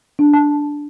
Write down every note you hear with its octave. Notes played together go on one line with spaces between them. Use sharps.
D4
A5